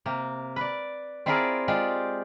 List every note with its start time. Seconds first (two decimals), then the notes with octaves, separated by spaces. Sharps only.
0.06 C3 A#3
0.56 B4 D5
1.26 C4 E4 F4 G#4 A#4 D5
1.68 G#3 F4 G4 D5 G5